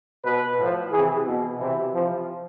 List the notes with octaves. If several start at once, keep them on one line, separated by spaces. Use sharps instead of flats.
B2 B4
A2 F3
C3 E3 G#4
B2
C3 E3 E4
C3 F3